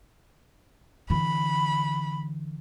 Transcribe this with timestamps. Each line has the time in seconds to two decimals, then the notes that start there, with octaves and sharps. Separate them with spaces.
1.10 D3 E3 B5